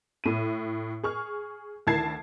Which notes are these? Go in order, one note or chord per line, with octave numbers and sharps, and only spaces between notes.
A2 D#7
G#4 C#6 F6
D2 D#3 E4 A5 G#6 C7